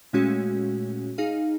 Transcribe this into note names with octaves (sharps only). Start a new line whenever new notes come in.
A#2 G#3 A3 C#4 F#4
D#4 G#4 F5